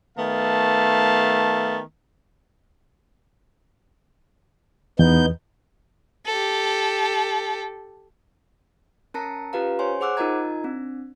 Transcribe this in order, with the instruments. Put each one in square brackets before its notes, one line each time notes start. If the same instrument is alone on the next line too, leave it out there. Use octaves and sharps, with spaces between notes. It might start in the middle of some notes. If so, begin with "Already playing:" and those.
[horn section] D#3 A3 B3 F5 A5
[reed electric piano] E2 [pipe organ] B3 D#4 G6
[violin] G4 A4
[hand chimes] C#4 A#4 A5 A#5 A#6 C#7
C#4 F4 G4 B4 F5 A#5
C5 C#5 G#5 C6
G#4 C5 F#5 D6 E6 F#6
D#4 F4 A#4 D#5 A#5 G#6
C4 D4